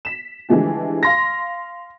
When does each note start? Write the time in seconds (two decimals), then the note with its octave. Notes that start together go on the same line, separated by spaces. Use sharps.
0.05 B6 E7
0.49 D3 E3 F3 G#3 A3 G4
1.03 F5 C6 A#6